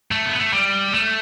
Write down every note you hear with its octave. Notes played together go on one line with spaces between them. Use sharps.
A3
B3
A3
G3
A3